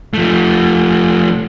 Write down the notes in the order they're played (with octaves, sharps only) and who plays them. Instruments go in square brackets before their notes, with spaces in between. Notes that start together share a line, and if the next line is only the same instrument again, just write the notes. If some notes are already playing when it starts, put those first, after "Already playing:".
[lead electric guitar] F3 A3